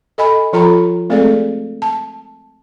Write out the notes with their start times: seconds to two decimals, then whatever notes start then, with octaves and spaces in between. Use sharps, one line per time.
0.18 A4 D#5 G#5 B5
0.53 F3 F4 A4 G5 A#5 B5
1.10 G#3 A3 C4 G#4 A4 D5
1.82 A5